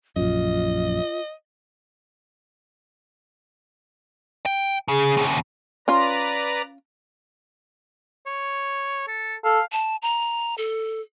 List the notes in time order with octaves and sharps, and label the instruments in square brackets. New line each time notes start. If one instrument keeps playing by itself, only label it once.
[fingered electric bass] A#1 F#2 [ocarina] F4 [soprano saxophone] D#5
[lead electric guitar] G5
[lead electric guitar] C#3 [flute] G#4
[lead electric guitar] D#2 C#3
[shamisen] C#4 F4 [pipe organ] B4 D5 A#5
[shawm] C#5
A4
[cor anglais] A4 [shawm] F5
[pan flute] A5
A#5
A4